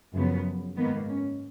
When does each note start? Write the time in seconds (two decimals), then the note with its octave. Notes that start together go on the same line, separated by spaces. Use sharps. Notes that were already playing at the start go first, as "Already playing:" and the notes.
0.14 F#2 C#3 F3 B3
0.76 G#2 D#3 A#3 B3
1.08 C#4